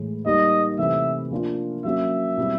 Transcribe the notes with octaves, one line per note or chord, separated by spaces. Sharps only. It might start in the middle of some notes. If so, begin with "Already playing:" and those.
Already playing: A2 E3 G#3
G3 A#3 D#4 G4 D#5
C3 E3 A3 E5
F3 A#3 D4 F4
F#3 A#3 C#4 F#4 E5
B2 G3 C4 E4